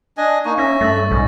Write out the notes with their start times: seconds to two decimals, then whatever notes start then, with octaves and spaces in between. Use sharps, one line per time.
0.17 D4 D#5 G#5
0.45 A#3 D#4 C#6
0.58 C#4 E5 A#6
0.81 G2 A3 E6 A6 A#6
1.11 B1 G#2 C#4